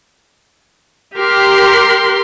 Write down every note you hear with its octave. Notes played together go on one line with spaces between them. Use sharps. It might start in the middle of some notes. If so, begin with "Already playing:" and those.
G4 A#4 C6